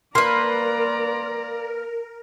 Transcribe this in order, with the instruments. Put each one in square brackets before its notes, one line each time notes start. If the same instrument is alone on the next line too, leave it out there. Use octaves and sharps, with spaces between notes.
[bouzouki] A#3 B4 [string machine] A#4 [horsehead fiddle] D5 A#5 [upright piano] C6